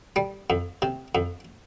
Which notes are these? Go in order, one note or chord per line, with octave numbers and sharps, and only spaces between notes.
G3
F2
C3
F2